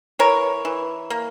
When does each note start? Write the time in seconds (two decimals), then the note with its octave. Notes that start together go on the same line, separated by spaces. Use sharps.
0.19 E3 A#4 C#5
0.65 E3
1.10 A#3